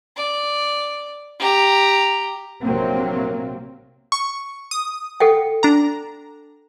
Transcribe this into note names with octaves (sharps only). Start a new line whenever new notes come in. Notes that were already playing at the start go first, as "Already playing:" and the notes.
D5
G4 A#5
A#1 C3 F#3 A#3 C4
C#6
D#6
A4 F#5 G5
D4 A#5